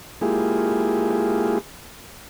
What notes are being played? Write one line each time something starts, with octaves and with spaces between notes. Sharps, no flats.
G#3 A#3 E4 F4 G4 G#4